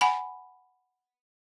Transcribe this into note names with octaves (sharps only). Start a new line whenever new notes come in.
F#5 G#5 B5